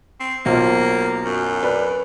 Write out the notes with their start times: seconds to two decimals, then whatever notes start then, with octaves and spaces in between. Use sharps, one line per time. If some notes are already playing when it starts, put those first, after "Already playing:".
0.20 C4
0.46 B1 A#3 F4 C5
1.25 F#2
1.63 B4 D5